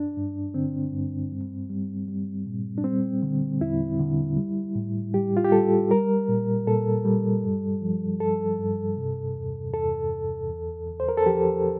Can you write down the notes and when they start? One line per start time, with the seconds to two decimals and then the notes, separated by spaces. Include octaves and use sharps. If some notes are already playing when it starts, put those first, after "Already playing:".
Already playing: G2 D4
0.17 G2
0.54 D3 C4
0.93 G2
1.32 G3
1.70 G3
2.08 G3
2.46 A#2
2.78 D4
2.84 G3 C4
3.22 D3
3.61 E2 E4
3.99 D3
4.37 G3
4.75 A2
5.14 G3 G4
5.37 F4
5.44 G4
5.52 G3 A4
5.91 G3 A#4
6.28 A#2
6.67 A#2 A4
7.05 G3
7.44 G2
7.82 F3
8.20 G2 A4
8.59 G2
8.97 C3
9.36 E2
9.73 E2 A4
10.12 E2
10.50 E2
10.88 E2
11.00 C5
11.09 A#4
11.18 A4
11.26 F3 G4